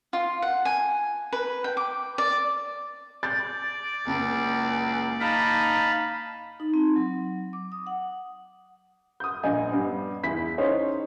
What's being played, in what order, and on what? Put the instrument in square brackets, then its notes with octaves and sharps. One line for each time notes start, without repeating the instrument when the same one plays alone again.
[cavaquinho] F4
F#5
G#5
B4
G5
D6
D5
[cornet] D5 [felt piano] G6 A6
[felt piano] F#1 [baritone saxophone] C#2
[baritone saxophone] D#4 [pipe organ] F5 A5 B5
[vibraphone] D#4
C4
F#3
D6
D#6
F#5
[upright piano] D#6 G6
A#1 D#5 G#5
G2 B3
E2 E4 B6
C#4 D#4 G#4 C5 C#5